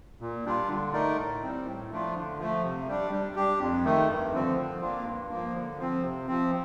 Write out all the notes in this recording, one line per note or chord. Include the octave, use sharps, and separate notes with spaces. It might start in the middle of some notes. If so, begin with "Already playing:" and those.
A#2
G3 D4 F4
D3
A3 D#4 A#4 D5
A2
G3 C4
A2
F3 A3 D4 F4
D3
F3 A3
C3
G3 D4
G3
D4 G4
F2
D#3 A3
G2
D3 F3 C4
F3
A#3 D4 F4
G2
F3 A#3
D3
F3 C4
C3
F3 C4